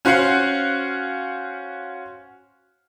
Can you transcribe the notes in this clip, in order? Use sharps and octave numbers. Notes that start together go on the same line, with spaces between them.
C#4 F#4 C5 F5 F#5